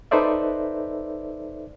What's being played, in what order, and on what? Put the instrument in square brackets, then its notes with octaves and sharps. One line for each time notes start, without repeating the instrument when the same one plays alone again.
[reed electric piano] D#4 A4 B4 C5 D5 E5